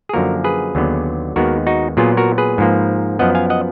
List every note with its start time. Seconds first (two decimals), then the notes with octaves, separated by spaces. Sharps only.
0.09 G#4
0.13 F#2 D3 F3 A#3 F#4 A#4
0.44 G#4 B4
0.75 D#2 D3 F#3 B3
1.36 D#2 D#3 G#3 B3 F#4 A#4
1.67 D#4 F#4
1.97 A#2 F#3 B3 F4 G#4
2.17 F#4 A#4
2.38 G#4 B4
2.58 G#2 F3 A#3
3.19 F#2 F3 B3 D#5 F#5
3.35 F5 G#5
3.50 D#5 F#5